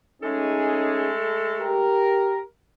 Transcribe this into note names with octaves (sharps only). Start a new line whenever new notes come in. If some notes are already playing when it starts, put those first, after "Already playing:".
G#3 A3 C#4 D#4 G#4 A4
G4 A#4